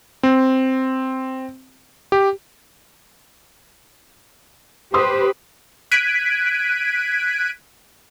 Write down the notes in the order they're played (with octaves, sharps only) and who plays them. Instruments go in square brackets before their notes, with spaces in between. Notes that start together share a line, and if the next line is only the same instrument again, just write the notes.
[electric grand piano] C4
G4
[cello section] G4 B4 C5 [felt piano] C6 D#6
[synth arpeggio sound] F#6 G#6 B6 D7 D#7